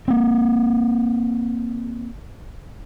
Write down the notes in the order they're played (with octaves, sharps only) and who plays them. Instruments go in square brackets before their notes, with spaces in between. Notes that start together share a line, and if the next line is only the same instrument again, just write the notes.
[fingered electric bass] A#3 C4